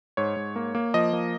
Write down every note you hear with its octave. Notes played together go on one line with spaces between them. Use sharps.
G#2 C#5
G#2
A#3
A#3
F3 D#5
A#3